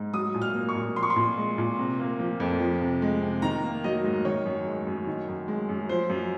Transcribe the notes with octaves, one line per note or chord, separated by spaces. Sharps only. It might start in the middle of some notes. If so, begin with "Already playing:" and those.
Already playing: G#2
F#3 D#6
A#2
F6
A#3
C#6
A#2
F3 C6
C#6
C6
A#2
G#3
A#2
C3
A#3
F3
F2
F3
C3
G#3
C3
D#3 A#5
A#3
F#3 D#5
G#2
D#3 C#5
F#2
G#3
F#2
D#3
F#2
G#3
F#2
F3 C5
F#2